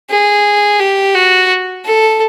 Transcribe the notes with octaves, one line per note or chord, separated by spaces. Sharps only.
G#4
G4
F#4
A4